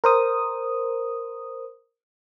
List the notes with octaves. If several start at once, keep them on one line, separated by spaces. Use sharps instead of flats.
A#4 C5 D#6